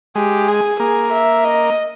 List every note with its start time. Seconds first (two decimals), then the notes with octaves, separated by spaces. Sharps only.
0.15 G#3 G4
0.48 G#4
0.80 A#3 G#4
1.12 E5
1.45 D#5